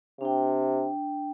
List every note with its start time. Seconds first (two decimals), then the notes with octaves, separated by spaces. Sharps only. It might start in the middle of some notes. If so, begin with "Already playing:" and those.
0.21 C3 D4 G5